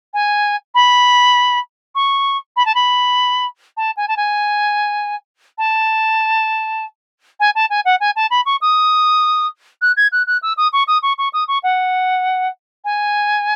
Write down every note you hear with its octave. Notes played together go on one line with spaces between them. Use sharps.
G#5
B5
C#6
B5
A5
B5
A5
G#5
A5
G#5
A5
G#5
A5
G#5
F#5
G#5
A5
B5
C#6
D#6
F#6
G#6
F#6
F#6
E6
D#6
C#6
D#6
C#6
C#6
D#6
C#6
F#5
G#5